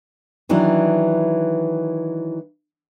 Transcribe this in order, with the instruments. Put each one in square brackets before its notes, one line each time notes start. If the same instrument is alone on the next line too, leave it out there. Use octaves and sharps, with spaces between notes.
[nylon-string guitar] D#3 E3 F#3 D4 E4